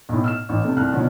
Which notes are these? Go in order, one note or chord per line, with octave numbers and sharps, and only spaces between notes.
B1 A2
E6 F6 E7
A1
C3 A3
C2 F6 F#6
B2 D3 F3 C#4